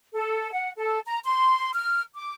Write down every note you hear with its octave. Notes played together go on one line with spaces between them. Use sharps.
A4
F#5
A4
A#5
C6
F6
D6